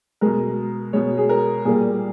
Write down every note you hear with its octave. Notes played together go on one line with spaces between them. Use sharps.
B2 G#3 A#4
B2 G#3 C#5
G#4
A#4
A#2 G3 A#3 G#4